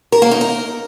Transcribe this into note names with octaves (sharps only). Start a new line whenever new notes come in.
A#4
A#3
D#4
A#4